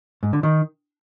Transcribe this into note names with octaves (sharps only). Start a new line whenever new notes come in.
G#2
D3
D#3